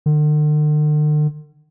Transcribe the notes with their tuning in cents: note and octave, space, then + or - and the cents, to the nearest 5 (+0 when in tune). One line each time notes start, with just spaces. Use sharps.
D3 +45